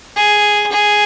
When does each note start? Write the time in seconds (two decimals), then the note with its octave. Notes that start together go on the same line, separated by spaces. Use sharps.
0.16 G#4
0.72 G#4